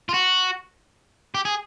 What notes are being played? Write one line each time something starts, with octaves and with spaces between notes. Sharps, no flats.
F4
F#4
G4
G#4